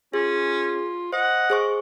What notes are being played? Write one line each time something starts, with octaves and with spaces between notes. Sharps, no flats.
C#4 F4 G#4
C5 D#5 F#5
G#4 C5 C#6